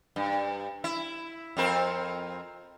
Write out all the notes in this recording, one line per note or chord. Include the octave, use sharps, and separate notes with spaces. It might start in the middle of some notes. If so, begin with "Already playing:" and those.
G2
E4
F2 C4 A#4